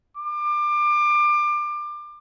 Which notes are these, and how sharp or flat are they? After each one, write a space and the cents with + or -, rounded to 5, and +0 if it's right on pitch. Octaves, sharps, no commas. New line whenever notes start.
D6 +25